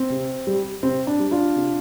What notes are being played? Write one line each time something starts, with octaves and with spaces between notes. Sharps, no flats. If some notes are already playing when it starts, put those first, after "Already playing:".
Already playing: C4
C3
G3
C3 C4
D4
G3
D4 F4
C3